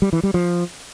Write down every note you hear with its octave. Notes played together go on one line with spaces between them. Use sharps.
G3
E3
G3
F3